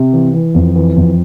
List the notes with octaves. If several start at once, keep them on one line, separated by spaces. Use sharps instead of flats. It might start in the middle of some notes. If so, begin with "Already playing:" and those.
Already playing: C3
E3
E3
F2
E3
F2